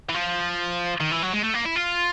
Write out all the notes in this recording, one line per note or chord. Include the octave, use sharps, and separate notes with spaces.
E3
F3
D#3
E3
F#3
G#3
A3
A#3
E4
F4